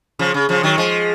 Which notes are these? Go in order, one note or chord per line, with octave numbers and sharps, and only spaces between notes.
C#3 F3
C#3
C#3 F3
D#3 F#3
F3 G#3